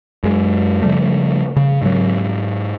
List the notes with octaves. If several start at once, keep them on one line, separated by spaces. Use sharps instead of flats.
F#2 G#3
C#3 F3 G3 A3
C#3
G#2 F#3